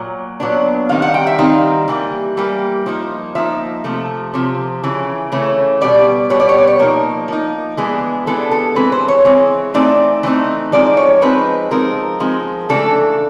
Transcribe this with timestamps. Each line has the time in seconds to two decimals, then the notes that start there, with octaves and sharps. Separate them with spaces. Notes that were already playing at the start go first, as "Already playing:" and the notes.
Already playing: A#2 F#3
0.40 A#2 F#3 B3 D4
0.89 D#3 G3 C4 D#4 F5
1.02 F#5
1.14 G5
1.27 E5
1.38 D#3 G3 C4 D#4 F5
1.88 E3 G3 A#3
2.37 E3 G3 A#3
2.86 F3 A#3 D#4
3.35 F3 A#3 D#4 E5
3.84 C3 F3 A3
4.34 C3 F3
4.83 C#3 E3
5.32 C#3 E3 A3 C#4
5.81 B2 G3 B3 D5
6.30 B2 G3 B3 C#5
6.40 D5
6.49 C#5
6.58 D5
6.67 C#5
6.79 F3 A#3 D#4 A#4
7.28 F3 A#3 D#4
7.77 E3 G#3 B3 D4 G#4
8.27 E3 G#3 B3 D4 A4
8.51 A4
8.75 E3 G#3 C4 B4
8.92 C5
9.08 C#5
9.25 E3 G#3 C4
9.74 E3 A3 C4 D#4 D5
10.23 E3 A3 C4 D#4
10.72 F3 G#3 C4 D#4 D5
10.97 C#5
11.21 F3 G#3 C4 D#4 B4
11.71 F3 G#3 C4 D#4 A#4
12.20 F3 G#3 C4 D#4
12.69 C#3 E3 A3 D4 A4